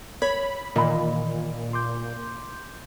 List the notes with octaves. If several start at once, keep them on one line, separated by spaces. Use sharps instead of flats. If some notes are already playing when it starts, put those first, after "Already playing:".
C#5 B5
A#2 D#3 E3 D#5 B5
C6 D6 G6